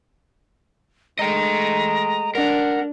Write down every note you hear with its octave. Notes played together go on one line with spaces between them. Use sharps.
G#3 A3 D#5 G5 A#5
D4 A#4 F#5